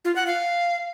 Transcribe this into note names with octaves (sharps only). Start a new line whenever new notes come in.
F4
F#5
F5